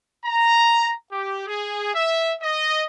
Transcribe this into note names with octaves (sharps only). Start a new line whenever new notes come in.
A#5
G4
G#4
E5
D#5